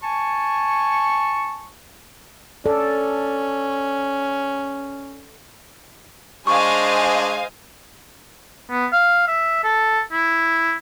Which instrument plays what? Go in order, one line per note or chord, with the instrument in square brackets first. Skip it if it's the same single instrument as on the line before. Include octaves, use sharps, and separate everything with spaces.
[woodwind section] G#5 A5 C#6
[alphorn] C#4 [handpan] A4 D5
[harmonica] G#3 D4 [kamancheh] C5 D#5 [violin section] F5 G#5 [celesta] C#6
[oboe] B3
F5
E5
A4
E4